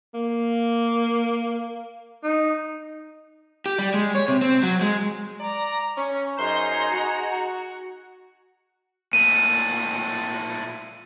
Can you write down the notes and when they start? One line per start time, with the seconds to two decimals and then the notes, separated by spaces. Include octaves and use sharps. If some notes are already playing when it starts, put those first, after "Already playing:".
0.14 A#3
2.23 D#4
3.66 G4
3.79 G3
3.94 G#3
4.15 C#5
4.28 C3
4.41 C4
4.63 F#3
4.81 G#3
5.40 D5 A#5
5.97 C#4 C#6
6.38 F#2 D#4 G#4 C5 A#5 C6
6.92 F#4
9.13 A#2 A3 D#7